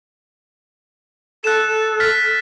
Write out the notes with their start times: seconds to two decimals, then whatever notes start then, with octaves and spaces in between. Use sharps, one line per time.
1.44 A4 F#6 E7
2.00 F6 A6 B6